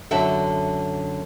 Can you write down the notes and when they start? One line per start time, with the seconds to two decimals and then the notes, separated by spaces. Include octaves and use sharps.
0.11 F#2 D3 F#4 A4 E5